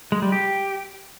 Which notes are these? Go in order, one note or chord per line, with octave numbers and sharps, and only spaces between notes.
G#3
G3
G4